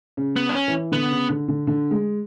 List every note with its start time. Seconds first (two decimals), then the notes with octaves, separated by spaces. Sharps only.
0.17 C#3
0.36 B3
0.49 D4
0.55 C#4
0.68 E3
0.92 D3 B3
1.11 C#3
1.29 D3
1.48 D3
1.67 D3
1.91 G#3